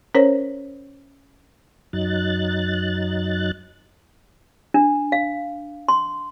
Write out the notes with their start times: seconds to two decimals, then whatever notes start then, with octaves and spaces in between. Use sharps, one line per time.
0.15 C#4 A#4 C5 C#5
1.93 F#2 F#3 D#4 F#6 A6
4.74 D4
5.12 F5
5.89 C6